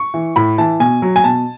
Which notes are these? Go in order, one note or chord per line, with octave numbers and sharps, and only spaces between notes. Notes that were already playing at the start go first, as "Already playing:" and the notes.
Already playing: C#6
E3
A2 B5
E3 A5
B2 G#5
F#3
G#5
B2 A5